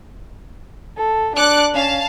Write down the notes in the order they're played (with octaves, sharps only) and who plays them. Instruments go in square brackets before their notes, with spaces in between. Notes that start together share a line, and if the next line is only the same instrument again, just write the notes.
[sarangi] A4
[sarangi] D4 [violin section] D6 F#6 C#7
[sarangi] C#4 [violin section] F5 A5